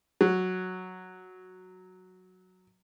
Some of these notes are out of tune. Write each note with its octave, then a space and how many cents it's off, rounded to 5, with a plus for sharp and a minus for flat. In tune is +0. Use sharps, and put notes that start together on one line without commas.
F#3 -5